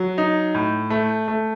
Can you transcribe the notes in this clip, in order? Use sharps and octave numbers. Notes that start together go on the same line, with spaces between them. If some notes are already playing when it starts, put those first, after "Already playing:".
Already playing: F#3
D#4
A2
A3
A3